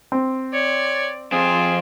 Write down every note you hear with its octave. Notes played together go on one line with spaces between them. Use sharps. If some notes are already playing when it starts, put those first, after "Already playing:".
C4
C#5 D5
F2 C4 F4 G#4